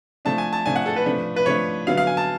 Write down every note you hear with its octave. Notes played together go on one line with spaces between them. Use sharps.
F3 A3 D4 A5
G#5
A5
F3 A3 D4 G#5
F#5
A4
B4
F3 A3 D4
B4
F3 A3 D4 C#5
D3 F#3 B3 F5
F5
G#5
A5